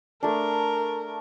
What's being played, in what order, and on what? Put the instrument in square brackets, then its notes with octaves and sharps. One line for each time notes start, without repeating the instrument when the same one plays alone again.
[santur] A3 D4 [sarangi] A#4